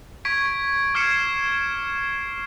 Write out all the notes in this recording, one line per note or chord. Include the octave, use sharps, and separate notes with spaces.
C#6 G#6 B6 D7
D6 F6 G#6 C7 C#7 E7